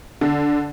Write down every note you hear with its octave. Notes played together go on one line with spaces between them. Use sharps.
D3